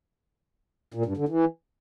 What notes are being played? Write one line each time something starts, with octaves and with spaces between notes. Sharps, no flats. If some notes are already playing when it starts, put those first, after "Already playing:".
A#2
G2
D3
E3